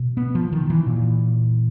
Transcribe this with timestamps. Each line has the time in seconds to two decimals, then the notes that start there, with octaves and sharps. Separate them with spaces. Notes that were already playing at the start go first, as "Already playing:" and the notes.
Already playing: B2
0.17 B3
0.35 F3
0.53 D#3
0.70 E3
0.87 A#2